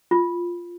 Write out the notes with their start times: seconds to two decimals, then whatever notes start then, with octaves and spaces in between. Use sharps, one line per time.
0.11 F4